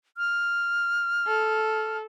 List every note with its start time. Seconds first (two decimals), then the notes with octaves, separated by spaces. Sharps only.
0.17 F6
1.27 A4